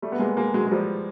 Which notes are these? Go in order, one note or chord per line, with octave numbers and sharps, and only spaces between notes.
G3 A3
B3
G#3 A#3
G#3 A#3
F#3 G#3
G#3
F3 G3